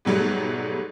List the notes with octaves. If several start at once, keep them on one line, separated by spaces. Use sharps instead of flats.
G#2 B2 F#3 G3 A3